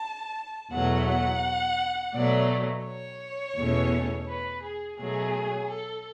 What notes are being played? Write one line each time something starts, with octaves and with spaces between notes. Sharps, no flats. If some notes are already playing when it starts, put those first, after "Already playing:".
Already playing: A5
E2 B2 F#3 A3 F#5
F#5
B2 F#3 A3 D5
C#5
E2 B2 A3 C#4
B4
G#4
B2 F#3 A3 G#4
A4